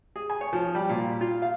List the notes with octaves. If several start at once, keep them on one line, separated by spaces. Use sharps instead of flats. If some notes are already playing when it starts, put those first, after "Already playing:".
G#4
G#5
C#5
F3
G3
A#2
F4
F5